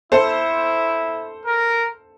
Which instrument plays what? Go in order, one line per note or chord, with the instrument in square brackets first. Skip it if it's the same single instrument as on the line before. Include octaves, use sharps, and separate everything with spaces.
[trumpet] E4 [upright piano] A4 C5
[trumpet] A#4